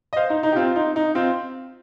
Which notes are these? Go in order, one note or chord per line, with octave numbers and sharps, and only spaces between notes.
D#5
C5 F5
D#4
D#4
G4
C4 F4
F4
D#4
D#4
C4 F4